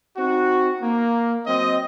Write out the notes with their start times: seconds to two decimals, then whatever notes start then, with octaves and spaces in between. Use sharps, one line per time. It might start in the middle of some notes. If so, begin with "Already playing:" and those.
0.18 C4 D#4 F#4
0.83 A#3
1.47 F#3 C4 D#5